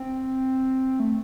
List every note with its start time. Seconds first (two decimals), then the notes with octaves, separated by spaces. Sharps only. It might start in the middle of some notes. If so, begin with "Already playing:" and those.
Already playing: C4
1.00 A3